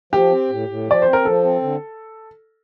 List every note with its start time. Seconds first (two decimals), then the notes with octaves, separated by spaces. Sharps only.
0.13 F3 G4
0.31 C4
0.50 A2
0.69 A2
0.87 F3 D5
1.02 C4 C5
1.13 A#4
1.25 F3 A4
1.43 C4
1.62 D3